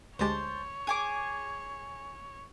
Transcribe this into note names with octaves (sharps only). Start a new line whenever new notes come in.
D2 G#3 G4 C5 C#5 A5
G#4 G#5 D6